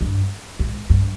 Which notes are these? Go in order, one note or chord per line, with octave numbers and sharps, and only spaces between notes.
G2
G#2
G2